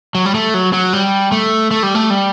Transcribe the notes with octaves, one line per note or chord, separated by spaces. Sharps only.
F#3
G3
A3
F#3
F#3
G3
A3
A3
G3
A3
G3